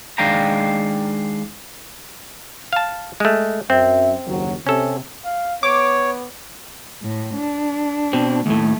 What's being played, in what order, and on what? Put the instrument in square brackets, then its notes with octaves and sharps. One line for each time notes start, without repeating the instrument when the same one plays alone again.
[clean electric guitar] D#3 G#3 D4 F5 G5 A#5
[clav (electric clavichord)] F5 A5
G#3 A3
[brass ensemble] F#2 E5 [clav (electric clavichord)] C4
[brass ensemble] F#1 D#2 F#3
[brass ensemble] C3 [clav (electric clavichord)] C#4 A4
[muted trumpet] F5
[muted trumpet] B3 [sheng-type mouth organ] C#5 [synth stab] D6
[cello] A2
D4
[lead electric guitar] B2 C4
[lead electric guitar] D#2 A2 [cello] A3